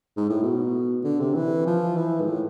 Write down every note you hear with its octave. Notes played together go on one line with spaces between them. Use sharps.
G#2
A2
B2
D3
C3
E3
F3
E3
G#2
A2